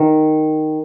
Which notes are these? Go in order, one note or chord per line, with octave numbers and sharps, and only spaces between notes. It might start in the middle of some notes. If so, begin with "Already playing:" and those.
Already playing: D#3